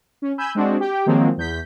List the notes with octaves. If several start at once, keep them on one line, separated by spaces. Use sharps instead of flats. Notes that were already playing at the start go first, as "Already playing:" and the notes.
C#4
G#5 B5 E6 G6
G#3 C4 D4 F#4
G4 G5
D#3 F3 F#3 G#3 A#3 C4
E2 G6 B6